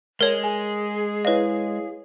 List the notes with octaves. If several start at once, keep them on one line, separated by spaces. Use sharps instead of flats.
G#3 A#4 C#5
G#4 G#5
E4 B4 C#5 D#5 F5